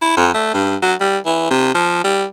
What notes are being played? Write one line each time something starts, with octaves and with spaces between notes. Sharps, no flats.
E4
F2
A3
G2
F#3
G3
E3
C3
F3
G3